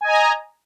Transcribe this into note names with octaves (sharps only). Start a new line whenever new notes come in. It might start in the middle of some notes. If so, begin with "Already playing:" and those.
D#5 G#5 A#5